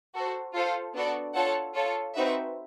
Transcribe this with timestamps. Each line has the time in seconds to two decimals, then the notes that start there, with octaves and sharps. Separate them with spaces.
0.14 F#4 A4 C5
0.54 F4 A4 C5 F5
0.94 B3 D4 F#4 A4 D5
1.34 F4 A4 C#5 F#5 A5
1.74 F4 A4 C#5
2.14 C4 D#4 F#4 B4 E5